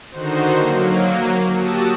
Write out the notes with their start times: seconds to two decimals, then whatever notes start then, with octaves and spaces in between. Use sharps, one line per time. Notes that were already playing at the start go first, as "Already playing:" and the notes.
0.11 D3 D#3 D#4 F#4 C5
0.54 F#3 A#3
1.56 F#4 G4 A5 D#6 E6